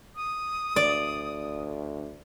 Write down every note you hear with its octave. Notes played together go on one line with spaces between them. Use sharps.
D#6
D2 D5